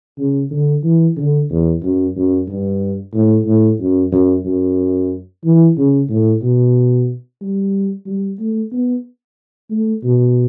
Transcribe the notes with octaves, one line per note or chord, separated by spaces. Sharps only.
C#3
D3
E3
D3
E2
F#2
F#2
G2
A2
A2
F#2
F#2
F#2
E3
C#3
A2
B2
G3
G3
A3
B3
A3
B2